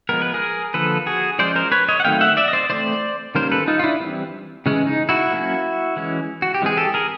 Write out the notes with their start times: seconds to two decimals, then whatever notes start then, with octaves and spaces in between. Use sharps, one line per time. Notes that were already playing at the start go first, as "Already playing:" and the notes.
0.09 F3 G#3 B3 A#4
0.22 B4
0.34 G#4 A#4
0.74 D3 F3 A#3 A4 B4
1.06 F#4 G#4
1.39 F3 G#3 C#4 C5 D5
1.56 A#4 C5
1.72 B4 C#5
1.89 C#5 D#5
2.00 F#5
2.05 D#3 F#3 A3 C4 F5 G5
2.21 E5 F#5
2.37 D5 E5
2.48 D#5
2.53 C5 D5
2.70 E3 A3 C4 C5 D5
3.35 D#3 G3 A#3 C#4 A#4 C5
3.51 A4 B4
3.68 D#4 F4
3.79 F4
3.84 D4 E4
4.00 E3 G3 C4
4.66 C#3 E3 G#3 C#4
4.87 D#4
5.09 E4 F#4
5.31 F#3 A#3 C#4
5.96 E3 G#3 C#4
6.42 F#4
6.54 G4
6.62 E3 G#3 C4 G#4
6.77 G4 A4
6.94 G#4 A#4